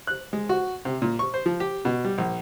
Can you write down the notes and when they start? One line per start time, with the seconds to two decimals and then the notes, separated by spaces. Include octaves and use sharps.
0.07 F#6
0.33 G#3
0.49 F#4
0.85 C3
1.02 A#2
1.19 C#6
1.34 C5
1.46 F3
1.60 G4
1.85 B2
2.04 G3
2.18 A#1